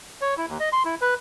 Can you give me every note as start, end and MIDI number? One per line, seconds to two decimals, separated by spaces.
0.21 0.34 73
0.37 0.46 64
0.49 0.58 39
0.60 0.69 75
0.73 0.83 84
0.85 0.95 64
1.01 1.14 71